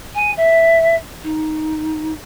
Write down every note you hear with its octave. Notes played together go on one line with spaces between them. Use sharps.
G#5
E5
D#4